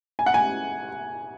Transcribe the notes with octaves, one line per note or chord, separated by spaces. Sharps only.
G#5
F#5
G#5